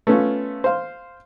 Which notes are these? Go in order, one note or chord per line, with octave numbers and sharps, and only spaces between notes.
A3 B3 C#4 F4
C5 F5